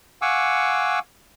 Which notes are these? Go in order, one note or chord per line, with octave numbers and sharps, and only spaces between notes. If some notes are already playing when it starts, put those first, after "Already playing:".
F5 F#5 G#5 C#6 D6 E6